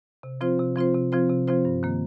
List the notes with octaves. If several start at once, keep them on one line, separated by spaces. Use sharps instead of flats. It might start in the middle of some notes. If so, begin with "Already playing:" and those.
C3
F3 C4 F4 C5
C3
F3 C4 F4 C5
C3
F3 C4 F4 C5
C3
F3 C4 F4 C5
G2
D#3 A#3